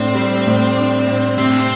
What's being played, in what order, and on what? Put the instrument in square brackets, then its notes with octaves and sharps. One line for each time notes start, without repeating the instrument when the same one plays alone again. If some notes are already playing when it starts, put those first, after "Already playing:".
Already playing: [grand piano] A2 D4 [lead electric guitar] C4
[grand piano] G3
A2
D4
A2
[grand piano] C3 [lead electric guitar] C4
[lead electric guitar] D4
C4